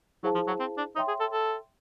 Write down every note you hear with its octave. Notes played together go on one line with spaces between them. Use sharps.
F#3 E4 G#4 C5 F5 A5
F3
F#3
C4
D4
D#4 C#5 E5 G5 C6
G#4
A4
A4